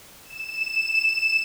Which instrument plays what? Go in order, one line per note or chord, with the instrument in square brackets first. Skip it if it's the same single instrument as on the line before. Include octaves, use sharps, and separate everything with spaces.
[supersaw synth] E7